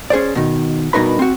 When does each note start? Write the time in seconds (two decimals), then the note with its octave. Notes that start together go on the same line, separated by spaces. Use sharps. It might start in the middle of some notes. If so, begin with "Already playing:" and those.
0.10 C#4 G#4 C5 D5
0.35 B2 D#3
0.93 G2 B2 D#4 A#4 B4 B5
1.19 C4 F#4